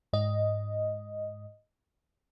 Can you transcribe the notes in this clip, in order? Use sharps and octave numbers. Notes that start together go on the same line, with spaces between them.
G#2 D#5